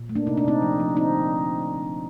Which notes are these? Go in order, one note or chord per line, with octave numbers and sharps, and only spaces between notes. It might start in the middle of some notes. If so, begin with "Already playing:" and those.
Already playing: A#2
A3
A#3 D4
C3 D#4
D4
C3 C4 D#4
F3
F3
D3 C4 D#4